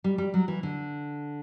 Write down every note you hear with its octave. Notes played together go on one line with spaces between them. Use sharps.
G3
G3
F#3
E3
D3